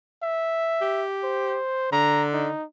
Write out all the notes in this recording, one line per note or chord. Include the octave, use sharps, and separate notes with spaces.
E5
G4
C5
D3 A#5
D#4